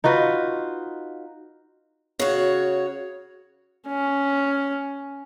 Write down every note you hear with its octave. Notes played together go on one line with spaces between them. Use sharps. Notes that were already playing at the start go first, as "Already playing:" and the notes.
D#4 F4 F#4 B4
C#3 F#4 C#5
C#4